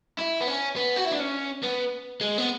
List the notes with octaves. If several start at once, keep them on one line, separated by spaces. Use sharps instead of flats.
E4
B3
C#4
B3
F#4
E4
D4
C#4
B3
G#3
B3